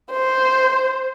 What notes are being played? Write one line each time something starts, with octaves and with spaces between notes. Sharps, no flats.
C5